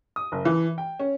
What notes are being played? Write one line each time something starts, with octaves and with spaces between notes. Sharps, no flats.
D#6
F#1
E3
G5
C#4